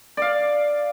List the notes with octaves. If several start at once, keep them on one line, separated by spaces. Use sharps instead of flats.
D5 F5